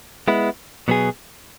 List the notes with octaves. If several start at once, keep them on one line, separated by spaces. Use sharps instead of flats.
G#3 B3 E4
B2 F#3 B3 G#4